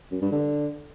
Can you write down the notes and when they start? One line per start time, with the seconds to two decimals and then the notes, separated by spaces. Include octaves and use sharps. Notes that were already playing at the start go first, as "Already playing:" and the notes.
0.12 F#2
0.22 G2
0.32 D3